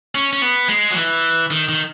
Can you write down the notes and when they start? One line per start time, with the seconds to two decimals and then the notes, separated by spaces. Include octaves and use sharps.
0.15 C#4
0.33 C#4
0.42 B3
0.69 G#3
0.91 F#3
0.96 E3
1.51 D#3
1.69 D#3